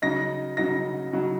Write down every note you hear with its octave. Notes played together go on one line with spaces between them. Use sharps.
C#3 F#3 D#4 A#6
C#3 F#3 D#4 A#6
C#3 F#3 D#4